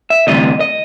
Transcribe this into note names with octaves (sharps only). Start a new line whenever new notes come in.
E5
D2 C3 E3 G3 D#5
D#5